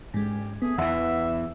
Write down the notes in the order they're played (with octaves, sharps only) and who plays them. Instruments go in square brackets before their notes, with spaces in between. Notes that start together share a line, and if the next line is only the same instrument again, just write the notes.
[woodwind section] D2 C#4 G4 [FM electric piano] G#2 G#3
[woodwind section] A3 G#4 [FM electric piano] B3
[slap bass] E2 E3 [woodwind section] E5 [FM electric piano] F#5